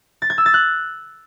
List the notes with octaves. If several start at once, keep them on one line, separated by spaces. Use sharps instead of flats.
A6
G#6
E6
A6
F#6